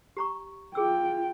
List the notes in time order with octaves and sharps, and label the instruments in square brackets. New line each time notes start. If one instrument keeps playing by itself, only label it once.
[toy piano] G4 A#5 C#6
[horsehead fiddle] F4 G5 [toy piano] G#4 E6